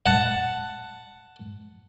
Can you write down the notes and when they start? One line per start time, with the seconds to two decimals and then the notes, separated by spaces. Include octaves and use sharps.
0.06 F#5 A5